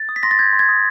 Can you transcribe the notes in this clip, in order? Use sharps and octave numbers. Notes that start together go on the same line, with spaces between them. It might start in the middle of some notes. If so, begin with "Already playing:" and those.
Already playing: A6
D#6
B6
C6 A#6
A6
G6 G#6
C6
G#6
D#6